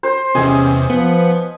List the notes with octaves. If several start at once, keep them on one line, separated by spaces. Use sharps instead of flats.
C5
E2 C3 C#4 D#5 G#5
F3 B3